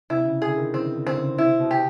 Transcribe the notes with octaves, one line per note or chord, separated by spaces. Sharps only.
C3 E4
C#3
D3 G#4
D#3
E3 C4
D3
D3 C4
C#3
C3 E4
B2
G4